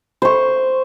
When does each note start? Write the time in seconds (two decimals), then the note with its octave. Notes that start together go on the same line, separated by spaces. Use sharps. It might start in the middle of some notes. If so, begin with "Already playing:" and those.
0.22 C5 C#6